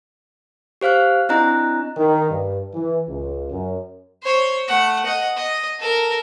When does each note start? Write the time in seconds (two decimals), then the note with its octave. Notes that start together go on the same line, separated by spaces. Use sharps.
0.81 G4 C5 F5 F6 F#6
1.29 C4 D4 E4 D#5 A#5 F#6
1.97 D#3
2.30 G2
2.74 E3
3.08 C#2
3.51 F#2
4.23 C5 C#5
4.68 A3 F#5
5.06 D#5 F#5
5.37 D#5
5.80 A4 A#4